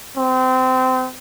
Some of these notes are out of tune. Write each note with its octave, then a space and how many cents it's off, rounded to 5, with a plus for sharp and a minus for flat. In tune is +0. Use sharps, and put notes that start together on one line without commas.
C4 -25